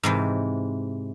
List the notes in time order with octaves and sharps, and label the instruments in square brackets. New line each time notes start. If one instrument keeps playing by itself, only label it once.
[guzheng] G#2 C3 E3